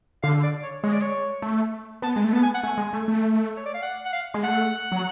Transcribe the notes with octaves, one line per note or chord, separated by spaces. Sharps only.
D3 F5
D5
C#5
G#3 C#5
D5
C#5
A3
B3 A5
G#3
A3
B3 A5
G#5
F#5
A3 G#5
G#3
A3
A3
C#5
D5
F5
F#5
F#5
F5
G#3
A3 F#5
F#3